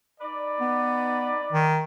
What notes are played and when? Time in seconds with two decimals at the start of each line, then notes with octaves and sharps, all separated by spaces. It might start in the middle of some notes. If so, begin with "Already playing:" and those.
0.21 D#4 B4 D5
0.61 B3
1.53 D#3